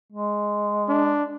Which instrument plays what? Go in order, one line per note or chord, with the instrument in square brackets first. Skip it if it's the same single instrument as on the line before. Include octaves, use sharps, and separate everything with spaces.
[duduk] G#3
[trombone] D4